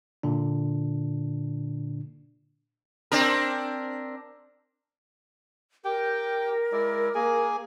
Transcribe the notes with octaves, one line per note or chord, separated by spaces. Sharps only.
A#2 D3 D4
C4 D4 A#4
G4 A#4 G5
G#3 E4 D5
A#3 G#4 G#5